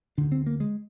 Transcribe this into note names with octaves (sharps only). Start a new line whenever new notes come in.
D2 D3 D4
C4
A#3
G#3